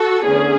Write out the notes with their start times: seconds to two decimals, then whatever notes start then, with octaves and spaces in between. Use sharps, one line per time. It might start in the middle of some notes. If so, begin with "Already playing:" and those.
Already playing: F#4 A4
0.23 E2 D3 A3 C#4 G#4